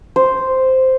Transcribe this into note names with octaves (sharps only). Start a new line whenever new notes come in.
C5